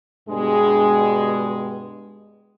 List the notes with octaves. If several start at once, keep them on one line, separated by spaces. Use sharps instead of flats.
G2 B2 G#3